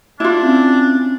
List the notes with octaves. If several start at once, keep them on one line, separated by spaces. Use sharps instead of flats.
D4 E4 F4
C4 C#4